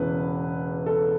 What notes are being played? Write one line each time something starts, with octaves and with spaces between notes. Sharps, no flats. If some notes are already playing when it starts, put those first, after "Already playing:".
Already playing: E1 E2 C#3 B4
A4